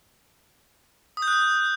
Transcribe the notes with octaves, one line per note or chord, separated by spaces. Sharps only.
D#6
G6
F#6
G6